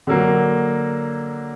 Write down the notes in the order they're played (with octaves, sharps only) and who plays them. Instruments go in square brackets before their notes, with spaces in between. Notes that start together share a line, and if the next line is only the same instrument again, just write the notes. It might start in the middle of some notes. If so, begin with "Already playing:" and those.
[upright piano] D3 F#3 A#3